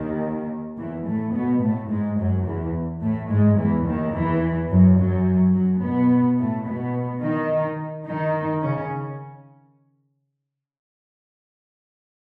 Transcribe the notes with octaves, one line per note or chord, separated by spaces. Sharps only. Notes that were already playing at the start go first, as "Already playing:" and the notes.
Already playing: D#2 D#3
E2 E3
A2 A3
B2 B3
A2 A3
G#2 G#3
F#2 F#3
E2 E3
A2 A3
G#2 G#3
E2 E3
D#2 D#3
E2 E3
F#2 F#3
F#2 F#3
F#2 F#3
B2 B3
A2 A3
B2 B3
D#3 D#4
D#3 D#4
C#3 C#4